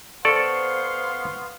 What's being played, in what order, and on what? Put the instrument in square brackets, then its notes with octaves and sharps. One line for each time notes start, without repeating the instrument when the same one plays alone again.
[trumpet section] B3 F5 C6 [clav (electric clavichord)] A4 D5 [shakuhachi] C5 [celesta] C#6 C#7